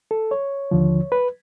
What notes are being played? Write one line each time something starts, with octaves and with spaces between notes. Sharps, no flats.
A4
C#5
D#2 D3 F3
B4